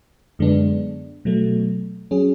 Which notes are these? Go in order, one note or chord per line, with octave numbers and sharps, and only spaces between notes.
F#2 D3 G#3 B3 D4
B2 F#3 A3
F#3 C#4 G#4